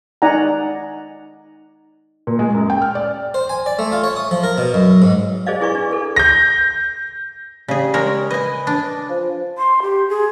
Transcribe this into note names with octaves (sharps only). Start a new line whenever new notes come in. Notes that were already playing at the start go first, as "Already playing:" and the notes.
D#4 D5 F#5 G#5 A#5
A#2
G#3
F#2
G5
F6
D5
C5
G#5
D5
A3
F4
C#5
D#6
F3
A#4
B2
F#2
G#2
G#4 C5 D5 D#5 F5
E4 G#4 B4 D5 C#6
D4
A4 B4
G6 A#6
C#3 G3 G#4
G#3 A#4 C#5
B4 D#5 G#5
D4
F3
C6
G4
G#4